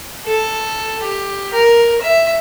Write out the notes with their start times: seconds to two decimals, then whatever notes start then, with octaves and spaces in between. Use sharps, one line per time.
0.25 A4
1.02 G4
1.53 A#4
2.01 E5